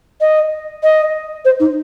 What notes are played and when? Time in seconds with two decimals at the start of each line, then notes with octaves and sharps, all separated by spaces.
0.21 D#5
0.83 D#5
1.45 C5
1.60 D#4